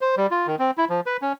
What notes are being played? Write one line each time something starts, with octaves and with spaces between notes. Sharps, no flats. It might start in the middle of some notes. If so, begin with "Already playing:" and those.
C5
G3
F4
D#3
C4
E4
F3
B4
C#4